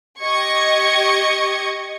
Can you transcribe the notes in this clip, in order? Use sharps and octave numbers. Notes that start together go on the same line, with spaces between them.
G4 D#5 C#6 G#6